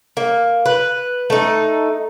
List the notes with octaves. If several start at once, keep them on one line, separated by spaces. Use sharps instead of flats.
A#3
B4
A3 D#4